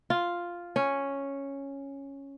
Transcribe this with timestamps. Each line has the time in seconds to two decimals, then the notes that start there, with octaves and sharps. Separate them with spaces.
0.10 F4
0.76 C#4